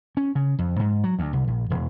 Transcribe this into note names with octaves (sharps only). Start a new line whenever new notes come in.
C#4
C#3
F2
G#2
F#3
D2
C2
A#1
E1